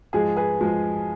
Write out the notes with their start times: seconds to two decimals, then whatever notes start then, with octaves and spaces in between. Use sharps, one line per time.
0.13 G#2 F3 G#3 G#4
0.36 G#4 B4
0.61 F3 G#3